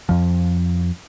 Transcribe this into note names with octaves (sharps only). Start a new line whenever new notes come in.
F2 F3